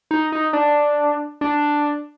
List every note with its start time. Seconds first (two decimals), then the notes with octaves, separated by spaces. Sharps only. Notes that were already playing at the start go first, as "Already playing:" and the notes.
0.11 D#4
0.32 D#4
0.53 D4
1.41 D4